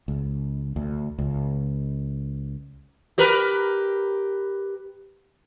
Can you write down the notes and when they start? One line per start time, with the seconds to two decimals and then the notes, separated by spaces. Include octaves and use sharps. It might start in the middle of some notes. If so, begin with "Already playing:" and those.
0.08 C#2
0.76 D2
1.19 C#2
3.18 G4 A#4 B4